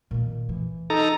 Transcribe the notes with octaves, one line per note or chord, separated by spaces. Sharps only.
A#2 D#3
E3
D#4 A4 A#5